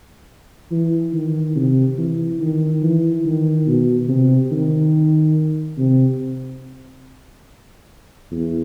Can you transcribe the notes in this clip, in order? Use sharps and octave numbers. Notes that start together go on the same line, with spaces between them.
E3
D#3
C3
E3
D#3
E3
D#3
B2
C3
D#3
C3
E2